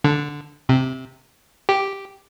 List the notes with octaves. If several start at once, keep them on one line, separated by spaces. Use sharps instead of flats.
D3
C3
G4